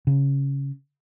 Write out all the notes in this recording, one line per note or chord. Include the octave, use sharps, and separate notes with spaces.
C#3